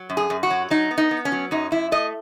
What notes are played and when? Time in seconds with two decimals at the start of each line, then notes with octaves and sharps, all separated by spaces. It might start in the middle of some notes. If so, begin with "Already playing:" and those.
Already playing: F#3
0.10 F#2
0.17 G#4
0.30 F#2
0.43 F#4
0.50 F#3
0.70 F#3 D#4
0.91 B3
0.98 D#4
1.11 B3
1.25 C#4
1.32 F#3
1.51 F#2 D#4
1.72 F#2 E4
1.92 A3 D#5